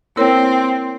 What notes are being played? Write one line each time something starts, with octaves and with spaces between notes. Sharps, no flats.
A#3 C4 E4 A#4 C#5